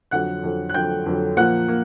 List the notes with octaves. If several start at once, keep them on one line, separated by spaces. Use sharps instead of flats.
F2 D3 F#3 F#5 F#6
F2 D3 F#3
F#6
F2 D3 F#3 G5 G6
F2 D3 F#3
A#2 F3 A#3 F#5 F#6
A#3